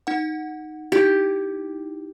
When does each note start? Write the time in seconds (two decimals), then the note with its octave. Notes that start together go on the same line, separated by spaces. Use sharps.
0.07 D#4 F#5
0.92 D#4 E4 G4